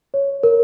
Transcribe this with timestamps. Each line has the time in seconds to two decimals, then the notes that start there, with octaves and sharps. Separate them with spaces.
0.14 C#5
0.43 A#4